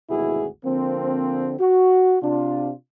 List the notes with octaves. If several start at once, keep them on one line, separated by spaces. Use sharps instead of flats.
G#1 D2 B2 E4 F#4 G#4
D3 F3 A#3 C4
F#4
C3 D4 F4